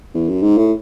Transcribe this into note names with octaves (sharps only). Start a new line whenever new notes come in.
E2
F#2
G#2
A2